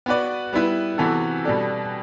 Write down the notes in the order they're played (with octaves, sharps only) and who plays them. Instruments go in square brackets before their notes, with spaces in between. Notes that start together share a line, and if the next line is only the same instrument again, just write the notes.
[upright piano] B3 F#4 B4 D5
G3 B3 E4 B4
C3 E3 B3 F#4 A4
B2 G3 B3 D4 A4